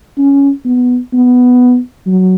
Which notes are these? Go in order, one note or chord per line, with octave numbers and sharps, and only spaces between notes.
C#4
B3
B3
F#3